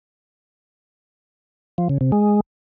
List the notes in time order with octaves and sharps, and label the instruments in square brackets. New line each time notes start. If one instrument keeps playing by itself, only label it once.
[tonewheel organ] F3
C#3
C3
G#3